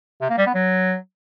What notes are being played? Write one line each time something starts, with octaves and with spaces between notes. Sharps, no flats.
C3
A#3
G3
B3
F#3